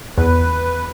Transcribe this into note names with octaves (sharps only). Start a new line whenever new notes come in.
E2 B4